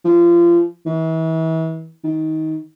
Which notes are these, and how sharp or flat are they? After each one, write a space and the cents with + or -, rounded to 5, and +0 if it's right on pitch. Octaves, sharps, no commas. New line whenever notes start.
F3 -30
E3 -35
D#3 +20